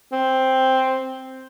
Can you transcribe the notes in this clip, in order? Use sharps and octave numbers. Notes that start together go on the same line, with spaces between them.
C4